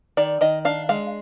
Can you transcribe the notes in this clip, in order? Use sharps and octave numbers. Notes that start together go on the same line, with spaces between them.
D#3 D5
D#3 D#5
D4 F5
G#3 F5